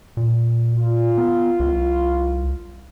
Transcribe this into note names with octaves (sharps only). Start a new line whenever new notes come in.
A#2
F4
B3
C2